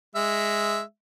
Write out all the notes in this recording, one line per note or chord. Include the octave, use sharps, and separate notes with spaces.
G#3 E5